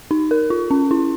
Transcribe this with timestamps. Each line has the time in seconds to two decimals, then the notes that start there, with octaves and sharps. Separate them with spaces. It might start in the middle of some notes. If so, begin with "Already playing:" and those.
0.11 D#4
0.31 A#4
0.50 F4
0.71 C#4
0.91 E4